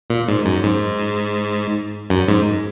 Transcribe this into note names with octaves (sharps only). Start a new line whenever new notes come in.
A#2
G#2
F#2
G#2
F#2
G#2